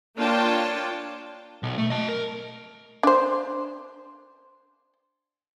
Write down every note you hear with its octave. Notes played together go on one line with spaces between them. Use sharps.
A#3 D4 F4 C#5 G5 A5
B1
A3
D#5 A5
A#4
D4 C5